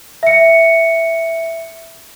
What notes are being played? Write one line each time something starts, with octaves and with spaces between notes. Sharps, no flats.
E5 C#7